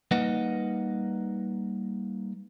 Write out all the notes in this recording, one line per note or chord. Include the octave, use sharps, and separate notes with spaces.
G3 A#3 D#4 B4 D#5 F#5